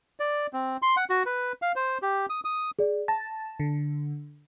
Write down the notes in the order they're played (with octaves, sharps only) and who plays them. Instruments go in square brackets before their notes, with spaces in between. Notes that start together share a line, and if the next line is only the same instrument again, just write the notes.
[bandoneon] D5
C4
C6
F#5
F#4
B4
F5
C5
G4
D#6
D#6
[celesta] G#4 D5
[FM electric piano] A5 [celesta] A#6
[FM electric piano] D3